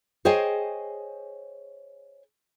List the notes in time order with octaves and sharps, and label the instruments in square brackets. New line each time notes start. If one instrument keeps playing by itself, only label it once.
[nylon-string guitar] G#4 C5 C#5 D#5 G5 G#5